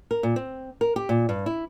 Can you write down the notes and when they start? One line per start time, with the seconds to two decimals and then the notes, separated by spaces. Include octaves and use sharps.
0.11 A#4
0.23 A#2
0.36 C4
0.81 A#4
0.96 G4
1.09 A#2
1.29 G2
1.46 E4